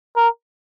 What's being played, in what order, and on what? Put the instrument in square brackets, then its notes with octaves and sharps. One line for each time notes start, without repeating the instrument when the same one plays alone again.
[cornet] A#4